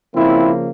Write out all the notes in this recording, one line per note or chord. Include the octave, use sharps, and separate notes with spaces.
C#3 F3 A#3 C4 E4